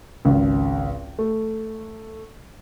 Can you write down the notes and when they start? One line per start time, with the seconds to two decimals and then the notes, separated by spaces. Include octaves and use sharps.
0.25 G#1 C#2
1.19 A3